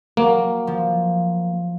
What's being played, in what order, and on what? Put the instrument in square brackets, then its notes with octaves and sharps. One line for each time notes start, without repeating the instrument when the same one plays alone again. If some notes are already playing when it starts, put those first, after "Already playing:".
[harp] F#3 [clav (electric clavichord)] A#3
[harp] F3